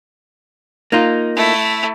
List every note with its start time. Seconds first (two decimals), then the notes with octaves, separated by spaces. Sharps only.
0.92 A#3 D#4 F4
1.36 A3 E4